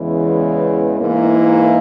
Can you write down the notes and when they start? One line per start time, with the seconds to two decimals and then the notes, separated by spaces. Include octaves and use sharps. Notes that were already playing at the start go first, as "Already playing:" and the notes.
Already playing: E2 C#3 E3 G#3 B3
0.97 G#2 E3 A#3 E4